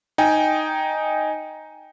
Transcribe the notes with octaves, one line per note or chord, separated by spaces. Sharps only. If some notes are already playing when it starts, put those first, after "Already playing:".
D#4 G5 G#5